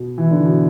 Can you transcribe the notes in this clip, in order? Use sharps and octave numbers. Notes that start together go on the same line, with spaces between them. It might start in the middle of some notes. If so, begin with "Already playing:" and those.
Already playing: B2
E3
D3
B2